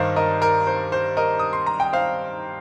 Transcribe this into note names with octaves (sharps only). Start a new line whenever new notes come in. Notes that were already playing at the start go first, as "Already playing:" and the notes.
Already playing: G2 D#3 G3 A#4 C5 D#5 F5
A#4 D#5
A#4
C5
C5
A#4 D#5
D#6
C6
A#5
G5
C5 F5